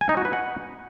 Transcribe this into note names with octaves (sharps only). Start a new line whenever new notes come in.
G#5
D#4
F#4
B4
F#5